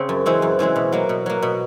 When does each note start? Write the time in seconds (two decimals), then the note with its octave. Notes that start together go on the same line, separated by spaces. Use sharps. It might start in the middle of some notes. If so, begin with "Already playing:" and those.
Already playing: C#3 C4
0.09 F#2
0.26 C#3 E3 G#3 C4
0.42 F#2
0.59 C#3 E3 G#3 C4
0.76 B2
0.92 F#3 A#3
1.09 B2
1.26 F#3 A#3
1.42 B2